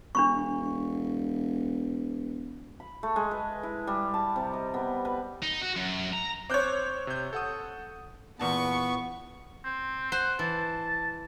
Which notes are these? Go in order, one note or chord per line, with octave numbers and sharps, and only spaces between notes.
E1 D4 B5 C#6
B5
A3
G#3
B4
E4
G3
A5
C3
D#5
B3
B4
D#4
F#4
F#2
A#5
C4 C#5 D6 F#6 G6
C3 G6
A4 F#5 D#6
E2 A#2 B3 B4 A5 C#6
C4
C5 F#5
E3 A5